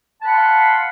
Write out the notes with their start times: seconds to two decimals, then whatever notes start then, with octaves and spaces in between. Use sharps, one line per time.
0.20 A5
0.24 B5
0.28 F#5
0.32 C6
0.36 F5